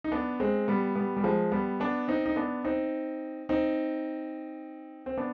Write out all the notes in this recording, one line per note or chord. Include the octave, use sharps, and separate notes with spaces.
D#4
B3 D4
G#3 C4
G3 B3
G3 B3
G3
F3 G#3
G3 B3
B3 D4
C4 D#4
D#4
B3 D4
C4 D#4
C4 D#4
C4
B3 D4